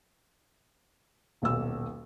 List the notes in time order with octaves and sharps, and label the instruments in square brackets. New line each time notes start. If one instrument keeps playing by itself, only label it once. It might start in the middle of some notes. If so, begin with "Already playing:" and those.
[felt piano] D#1 B1 E6